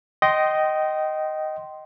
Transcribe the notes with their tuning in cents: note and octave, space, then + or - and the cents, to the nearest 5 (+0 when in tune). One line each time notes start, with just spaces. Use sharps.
D#5 +0 G5 -25 C6 +0